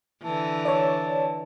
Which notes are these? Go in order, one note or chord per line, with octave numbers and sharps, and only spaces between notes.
D3 E3 A5
C#5 D5 A5